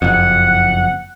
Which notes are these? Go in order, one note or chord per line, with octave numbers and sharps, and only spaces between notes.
F#1 F2 F#5